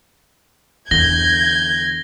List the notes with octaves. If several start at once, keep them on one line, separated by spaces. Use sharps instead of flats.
E2 D3 G6 G#6 A#6 G7